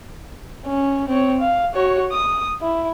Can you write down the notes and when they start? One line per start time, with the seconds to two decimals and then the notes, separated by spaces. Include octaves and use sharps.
0.66 C#4
1.08 C4 C#5
1.40 F5
1.74 F#4 C#5
2.12 D#6
2.62 E4